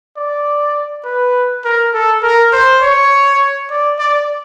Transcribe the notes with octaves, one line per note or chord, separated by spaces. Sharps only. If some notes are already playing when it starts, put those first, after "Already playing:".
D5
B4
A#4
A4
A#4
C5
C#5
D5
D5